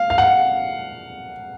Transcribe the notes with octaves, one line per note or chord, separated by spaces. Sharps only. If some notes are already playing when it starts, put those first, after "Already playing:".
Already playing: F5
F5
F#5